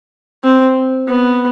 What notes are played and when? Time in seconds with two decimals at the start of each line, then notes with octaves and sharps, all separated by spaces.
0.44 C4
1.08 B3